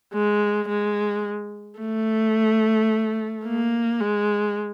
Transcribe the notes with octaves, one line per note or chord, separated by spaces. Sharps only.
G#3
G#3
A3
A#3
G#3